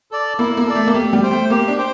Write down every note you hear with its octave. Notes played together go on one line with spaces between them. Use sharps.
A4 D5
A#3 E4
A#3
A4 D5
A3
A#3
A3 G4
G3
C5 G5
A3
A#3 G4
D4
C5 G5